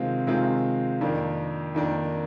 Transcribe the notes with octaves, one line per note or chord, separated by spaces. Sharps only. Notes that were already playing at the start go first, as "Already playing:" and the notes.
Already playing: C3 D#3 G#3 C4 F4
C3 D#3 G#3 C4 F4
F2 D#3 A#3 D4
F2 D#3 A#3 D4